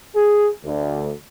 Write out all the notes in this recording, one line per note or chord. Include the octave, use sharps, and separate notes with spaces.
G#4
D2